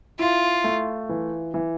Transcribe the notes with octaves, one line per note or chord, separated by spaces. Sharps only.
E4 F4
A3
E3
E3